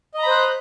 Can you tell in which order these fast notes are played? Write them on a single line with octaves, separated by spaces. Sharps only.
D#5 A#5 B5 C5 F#6